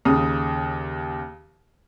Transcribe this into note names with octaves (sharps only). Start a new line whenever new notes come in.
D#2 C#3 D#6